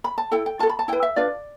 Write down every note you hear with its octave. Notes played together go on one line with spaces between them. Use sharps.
B5
A5
E4 A4 G5
G5
F4 A4 A5
B5
A5
E4 B4 G5
E5
D4 F4 B4 D5